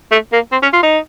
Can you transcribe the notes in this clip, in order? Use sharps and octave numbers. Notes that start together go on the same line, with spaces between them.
A3
A#3
C4
C#4
F4
D#4